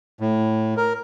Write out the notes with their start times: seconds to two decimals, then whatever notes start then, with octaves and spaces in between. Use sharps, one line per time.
0.20 A2
0.77 A#4